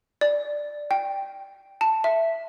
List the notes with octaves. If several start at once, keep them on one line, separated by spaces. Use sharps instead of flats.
D5
G5
A5
E5